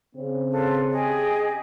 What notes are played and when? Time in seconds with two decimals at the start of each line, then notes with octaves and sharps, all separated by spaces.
0.16 C#3 C4
0.51 F4 A4 B4
0.90 G4 G#4 D#5